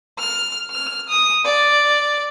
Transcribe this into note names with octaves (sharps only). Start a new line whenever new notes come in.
F6
F6
D#6
D5